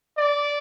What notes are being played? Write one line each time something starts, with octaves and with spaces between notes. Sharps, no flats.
D5